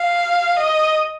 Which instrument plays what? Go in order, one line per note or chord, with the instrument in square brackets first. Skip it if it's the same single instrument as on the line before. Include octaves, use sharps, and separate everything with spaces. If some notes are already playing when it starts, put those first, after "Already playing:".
Already playing: [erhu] F5
D#5